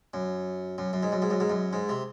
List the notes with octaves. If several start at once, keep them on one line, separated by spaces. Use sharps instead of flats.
F#2
F#2
F#2
G#2
F#2
G#2
F#2
G#2
F#2
G#2
C3